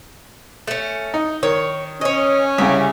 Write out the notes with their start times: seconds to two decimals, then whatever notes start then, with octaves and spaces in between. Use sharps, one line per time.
0.67 A3 C#4
1.14 D#4
1.43 D#3 C#5
2.01 C#4 C#5 D#5
2.58 C2 C#3 G4